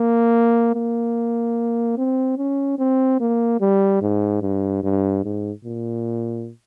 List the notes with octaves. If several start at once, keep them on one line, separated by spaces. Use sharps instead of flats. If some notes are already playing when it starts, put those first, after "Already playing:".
Already playing: A#3
A#3
C4
C#4
C4
A#3
G3
G#2
G2
G2
G#2
A#2